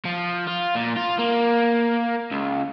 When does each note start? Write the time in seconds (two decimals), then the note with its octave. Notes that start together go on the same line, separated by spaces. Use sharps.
0.05 F3
0.48 F4
0.75 A#2
0.97 F4
1.19 A#3
2.31 C#2